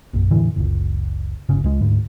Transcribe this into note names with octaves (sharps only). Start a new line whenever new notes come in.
A#1 F#2
E2 A2 D3 E3
F#1 C#2
D1 G1 C#3 C#4
C#2 G#3
D2 G#2